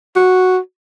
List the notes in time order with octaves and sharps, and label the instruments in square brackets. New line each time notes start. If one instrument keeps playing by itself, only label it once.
[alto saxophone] F#4